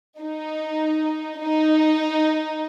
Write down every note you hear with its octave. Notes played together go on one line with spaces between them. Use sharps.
D#4
D#4